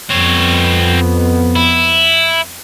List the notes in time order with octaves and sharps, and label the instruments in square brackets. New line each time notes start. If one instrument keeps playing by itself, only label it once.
[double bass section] F2 B3 [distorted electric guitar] C4 C#5
[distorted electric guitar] E4